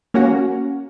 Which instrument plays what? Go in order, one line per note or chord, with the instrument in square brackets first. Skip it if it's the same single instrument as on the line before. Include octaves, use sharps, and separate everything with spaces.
[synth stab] A#3 C#4 F#4